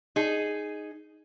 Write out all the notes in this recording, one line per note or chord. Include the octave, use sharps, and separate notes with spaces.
D#4 G#4